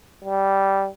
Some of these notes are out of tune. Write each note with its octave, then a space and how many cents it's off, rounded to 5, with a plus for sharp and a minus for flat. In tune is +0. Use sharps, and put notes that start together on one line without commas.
G3 -10